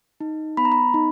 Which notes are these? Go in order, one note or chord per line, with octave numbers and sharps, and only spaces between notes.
D#4
B3 B5
A#5
B5
D#4